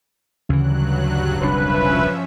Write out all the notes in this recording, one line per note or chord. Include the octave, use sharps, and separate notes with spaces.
D2 G2 C#3 E3 F#3 F#6
E1 C2 F3 C#4 D4 B4 E5